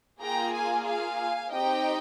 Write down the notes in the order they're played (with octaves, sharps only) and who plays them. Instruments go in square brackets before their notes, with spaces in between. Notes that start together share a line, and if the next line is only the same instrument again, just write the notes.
[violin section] A#3 F4 G#4 G5 A#5
F5 G#5
F5 G#5
C4 D#4 G4 D#5 G5